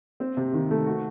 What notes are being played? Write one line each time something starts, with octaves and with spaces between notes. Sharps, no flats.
C4
C3
D#3
A3
F#4